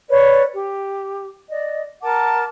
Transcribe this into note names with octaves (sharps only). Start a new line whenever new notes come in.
B4 C#5 D5
G4
D5 D#5
A#4 F#5 A5 D6